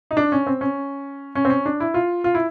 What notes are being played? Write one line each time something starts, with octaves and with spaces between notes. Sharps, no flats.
D#4
D4
C#4
C4
C#4
C#4
C4
C#4
D4
E4
F4
F4
E4